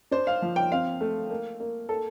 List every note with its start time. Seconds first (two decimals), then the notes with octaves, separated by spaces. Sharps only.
0.11 D4 C5
0.27 F5
0.42 F3
0.56 G5
0.72 C4 F5
1.01 A3
1.30 A#3
1.60 A#3
1.89 A#3 A4